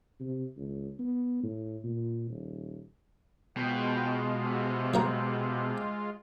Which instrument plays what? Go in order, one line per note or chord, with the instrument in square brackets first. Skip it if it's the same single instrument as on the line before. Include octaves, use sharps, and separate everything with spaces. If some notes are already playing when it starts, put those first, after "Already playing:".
[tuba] C3
C#2
B3
A2
A#2
D#1
[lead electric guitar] B2 [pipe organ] G#3 F4 [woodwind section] C4 B4 G5
[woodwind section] C3
[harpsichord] F#3 A#3 A#4